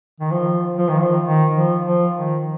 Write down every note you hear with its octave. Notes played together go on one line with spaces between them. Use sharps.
D#3
F3
F3
D#3
F3
D#3
F3
F3
D#3